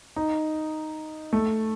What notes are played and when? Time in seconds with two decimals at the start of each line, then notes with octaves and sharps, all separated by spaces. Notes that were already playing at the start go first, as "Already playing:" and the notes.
0.16 D#4
1.33 A3